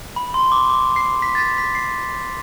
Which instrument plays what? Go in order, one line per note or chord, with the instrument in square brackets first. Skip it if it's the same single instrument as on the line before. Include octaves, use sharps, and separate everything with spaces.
[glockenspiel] B5
C6
D6
D6
C7
B6
A6
B6
B6
C7